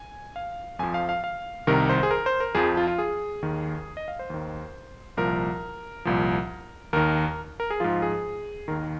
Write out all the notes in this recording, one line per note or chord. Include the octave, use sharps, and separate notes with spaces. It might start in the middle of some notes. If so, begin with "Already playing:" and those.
Already playing: G#5
F5
F2 F3 G#5
F5
F5
F5
C2 C3 D#3 A#4
C5
G#4
A#4
C5
A#4
F2 F3 G#4
F4
F4
G#4
D#2 D#3
D#5
F5
C5
D#2 D#3
C2 A#2 F3 A#4
C2 A#2 F3
D#2 D#3 A#4
A#4
G#4
G#2 F3 F4
G#4
D#2 D#3 A#4